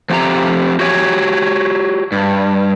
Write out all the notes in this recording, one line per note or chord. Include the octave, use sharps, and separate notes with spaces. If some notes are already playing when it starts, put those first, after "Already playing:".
F3 A3 C4 G4 A#5
F#4 G4 C#5 D#5 G#5
G2